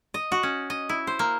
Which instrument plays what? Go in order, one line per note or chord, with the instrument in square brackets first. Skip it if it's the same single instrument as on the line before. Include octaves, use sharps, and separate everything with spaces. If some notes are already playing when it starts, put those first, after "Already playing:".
[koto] D#5
F#4
C#4
D#5
E4
C5
A#3